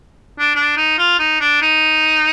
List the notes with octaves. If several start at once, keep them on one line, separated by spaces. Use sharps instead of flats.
D4
D4
D#4
F4
D#4
D4
D#4